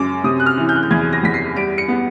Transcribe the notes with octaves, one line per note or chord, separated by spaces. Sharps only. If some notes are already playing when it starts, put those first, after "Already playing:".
Already playing: F#2 C#3 G#3 D6
C3 D#6
F#6
F6
E3
G6
F#6
G6
E2 G#6
A#6
E2 B6
C7
G3 D7
C#7
B3